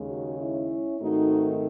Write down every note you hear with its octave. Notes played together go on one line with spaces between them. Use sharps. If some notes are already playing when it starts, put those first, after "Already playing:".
Already playing: D#2 C#3 G#3
D#4 F#4
C#4 E4
G#2 D#3 A3 C4 D#4 F#4